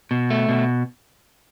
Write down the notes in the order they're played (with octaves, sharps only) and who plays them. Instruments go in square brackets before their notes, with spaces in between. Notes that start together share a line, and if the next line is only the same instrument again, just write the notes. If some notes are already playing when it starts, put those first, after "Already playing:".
[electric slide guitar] B2
A3
B2